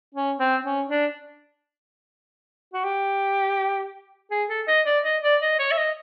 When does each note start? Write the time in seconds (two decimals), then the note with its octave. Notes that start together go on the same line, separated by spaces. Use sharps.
0.15 C#4
0.39 C4
0.64 C#4
0.88 D4
2.74 F#4
2.84 G4
4.31 G#4
4.49 A4
4.68 D#5
4.86 D5
5.04 D#5
5.23 D5
5.41 D#5
5.59 C#5
5.71 E5
5.78 D#5